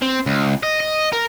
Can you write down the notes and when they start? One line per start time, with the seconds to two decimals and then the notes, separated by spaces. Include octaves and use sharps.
0.02 C4
0.26 C#2
0.63 D#5
0.80 D#5
1.12 A#4